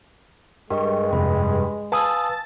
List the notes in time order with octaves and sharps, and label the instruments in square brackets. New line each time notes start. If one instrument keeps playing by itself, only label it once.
[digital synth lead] G2 [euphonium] G#3 [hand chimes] A#4 D#5 C#6
[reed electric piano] F2 C3 [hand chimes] B5
[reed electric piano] B4 G#5 D#6 [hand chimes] F5 E6 [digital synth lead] A5